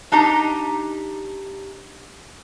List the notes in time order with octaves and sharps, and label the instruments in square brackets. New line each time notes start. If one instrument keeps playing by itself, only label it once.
[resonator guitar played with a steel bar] D4 D#4 G4 A#5